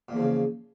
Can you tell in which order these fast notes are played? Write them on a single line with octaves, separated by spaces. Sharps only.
A#2 E2 F3 C#3